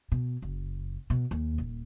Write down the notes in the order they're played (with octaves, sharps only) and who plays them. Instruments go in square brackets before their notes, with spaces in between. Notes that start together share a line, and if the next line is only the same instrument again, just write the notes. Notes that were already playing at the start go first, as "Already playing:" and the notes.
[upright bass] B2
F#1
B2
D#2
D#1